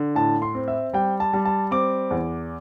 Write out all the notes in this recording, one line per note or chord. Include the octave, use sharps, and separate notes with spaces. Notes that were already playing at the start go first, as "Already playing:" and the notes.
Already playing: D3
A2 A5
C6
C4
E5
G3 G5
A5
G3
A5
C4 D6
E2